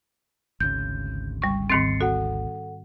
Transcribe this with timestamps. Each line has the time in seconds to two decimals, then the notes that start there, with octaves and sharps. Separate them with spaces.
0.60 G#1 D2 C#3 G6
1.42 G3 C#6
1.70 G#2 D#3 C4 A6 C7 C#7
2.01 F#4 A4 F#5